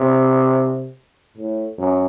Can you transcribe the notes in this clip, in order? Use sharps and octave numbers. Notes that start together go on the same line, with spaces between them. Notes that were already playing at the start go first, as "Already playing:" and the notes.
Already playing: C3
A2
F#2